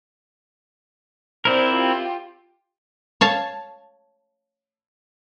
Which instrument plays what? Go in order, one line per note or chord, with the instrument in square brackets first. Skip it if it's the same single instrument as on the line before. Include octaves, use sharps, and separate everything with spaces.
[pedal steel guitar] C4 E4 A#4 [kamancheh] C5 D5
[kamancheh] F4 G4
[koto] C#5 F5 A5